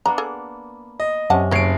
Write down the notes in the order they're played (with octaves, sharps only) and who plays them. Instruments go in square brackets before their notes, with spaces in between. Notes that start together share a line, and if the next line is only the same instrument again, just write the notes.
[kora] A#3 B3 D4 [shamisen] A#5
[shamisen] G#4 A4
[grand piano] D#5
[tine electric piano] F#2 [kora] C3 C#4 [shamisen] G4 F#5 A5
[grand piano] F#1 C7 D7 [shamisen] F#4 C#5